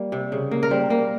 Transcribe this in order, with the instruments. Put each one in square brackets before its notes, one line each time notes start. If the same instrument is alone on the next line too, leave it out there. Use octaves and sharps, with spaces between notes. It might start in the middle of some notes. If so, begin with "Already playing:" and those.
Already playing: [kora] G3 A#3
C3
C#3
A#3
A#4
G3 C5
A#3